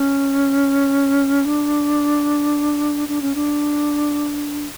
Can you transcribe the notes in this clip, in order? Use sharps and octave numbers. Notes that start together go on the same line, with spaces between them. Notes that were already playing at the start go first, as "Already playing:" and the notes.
Already playing: C#4
D4
D4
C#4
D4